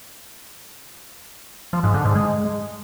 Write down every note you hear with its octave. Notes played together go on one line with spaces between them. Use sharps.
F3
G#2
D3
G#2
G#3